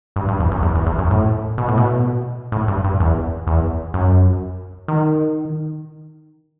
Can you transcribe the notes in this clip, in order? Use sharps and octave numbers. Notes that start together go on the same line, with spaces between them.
G2
G2
E2
F#2
E2
E2
E2
F#2
A2
B2
A2
B2
A2
G2
G2
E2
E2
F#2
D#3